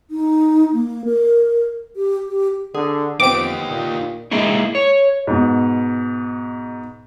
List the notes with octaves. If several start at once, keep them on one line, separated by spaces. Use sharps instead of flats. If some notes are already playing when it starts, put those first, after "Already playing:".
D#4
A#3
A#4
G4
G4
D3 G#4
F2 B3 C4 D#4 G4 C5 D6 D7
A#2
G#3 A#3 D#4 E4
C#5
G#2 B2